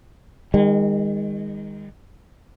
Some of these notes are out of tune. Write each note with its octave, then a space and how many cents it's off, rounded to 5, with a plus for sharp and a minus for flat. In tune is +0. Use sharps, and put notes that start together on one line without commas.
D#3 +0 G#3 -35